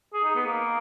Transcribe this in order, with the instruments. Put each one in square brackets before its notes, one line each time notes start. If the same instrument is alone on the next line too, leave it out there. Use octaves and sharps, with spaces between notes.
[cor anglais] G#4
D#4
B3
A#3